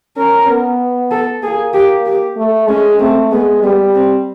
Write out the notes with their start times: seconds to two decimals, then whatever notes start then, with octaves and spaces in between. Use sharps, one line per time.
0.17 C#4 A#4
0.48 B3
1.11 A4
1.43 A#3 G#4
1.74 G4
2.06 G4
2.37 A3
2.68 G#3 C#4
2.99 A3 C4
3.31 G#3 B3
3.62 G3 B3
3.94 C4